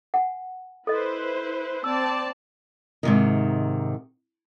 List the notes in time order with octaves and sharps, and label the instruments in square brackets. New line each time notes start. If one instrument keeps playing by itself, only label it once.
[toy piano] F#5 G#5
[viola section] E4 B4 C5 [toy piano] A4 D#5
[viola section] C4 D5 A5 [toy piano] E6
[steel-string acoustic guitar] G#2 C3 D#3